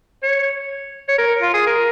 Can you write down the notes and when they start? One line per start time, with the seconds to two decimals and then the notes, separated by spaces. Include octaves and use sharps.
0.23 C#5
1.08 C#5
1.18 A#4
1.42 F4
1.54 G#4
1.67 A#4